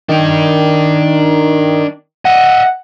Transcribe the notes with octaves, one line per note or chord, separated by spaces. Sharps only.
D#3 D4 G5
D#5 E5 F#5